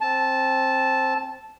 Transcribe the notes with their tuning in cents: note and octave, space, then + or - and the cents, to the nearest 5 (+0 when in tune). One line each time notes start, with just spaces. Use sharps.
C4 +15 A5 -10